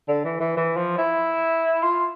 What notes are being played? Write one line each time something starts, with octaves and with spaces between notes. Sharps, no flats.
D3
E3
E3
E3
F3
E4
F4